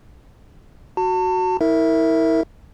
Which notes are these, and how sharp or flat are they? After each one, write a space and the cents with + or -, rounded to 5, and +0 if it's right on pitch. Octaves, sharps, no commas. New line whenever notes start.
F#4 +0 A5 +35
E4 -30 A#4 -15 E5 +0